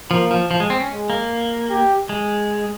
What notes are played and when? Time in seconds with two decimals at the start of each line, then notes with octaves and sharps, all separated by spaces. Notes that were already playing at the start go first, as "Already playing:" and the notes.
0.11 F3 A#3
0.31 F3
0.51 F3
0.60 G#3
0.70 C4
0.80 C#4
0.90 G#3
1.10 A#3
1.70 G4
2.09 G#3